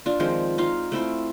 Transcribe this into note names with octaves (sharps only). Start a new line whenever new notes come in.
D4 F4
D#3 F3 G#3 C4
D#4 F4 F5
A3 C4 E4 F4